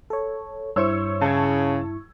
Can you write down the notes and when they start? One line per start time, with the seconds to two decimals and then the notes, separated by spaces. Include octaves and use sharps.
0.10 A4 C#5
0.76 G2 E4 C5 C#5 C#6 E6
1.21 C#3 A5 G#6